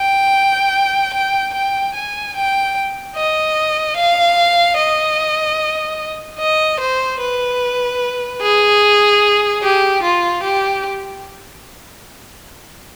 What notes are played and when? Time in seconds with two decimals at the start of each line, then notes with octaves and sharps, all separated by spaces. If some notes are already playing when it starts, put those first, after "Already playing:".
Already playing: G5
1.14 G5
1.54 G5
1.95 G#5
2.36 G5
3.16 D#5
3.97 F5
4.78 D#5
6.39 D#5
6.80 C5
7.20 B4
8.41 G#4
9.63 G4
10.03 F4
10.44 G4